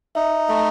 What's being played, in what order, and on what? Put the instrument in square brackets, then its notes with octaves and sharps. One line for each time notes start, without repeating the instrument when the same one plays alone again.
[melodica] D#4 [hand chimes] E5
[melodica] A3 [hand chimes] E5